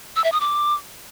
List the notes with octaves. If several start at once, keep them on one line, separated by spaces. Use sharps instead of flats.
E6
E5
D#6
D6